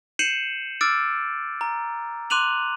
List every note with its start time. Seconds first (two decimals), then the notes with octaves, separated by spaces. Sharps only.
0.19 G6 C7 C#7 D#7 E7 F#7
0.81 D6 E6 F6 A6 D7
1.61 A#5
2.30 C6 D6 F#6 D#7 F7 F#7